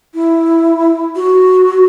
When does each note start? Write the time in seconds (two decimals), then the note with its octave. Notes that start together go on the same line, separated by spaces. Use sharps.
0.15 E4
1.16 F#4